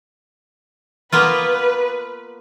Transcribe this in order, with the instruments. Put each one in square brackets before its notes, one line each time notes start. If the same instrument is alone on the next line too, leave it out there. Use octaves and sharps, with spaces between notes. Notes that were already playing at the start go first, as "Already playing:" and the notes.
[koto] A#3 B3 F4 [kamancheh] B4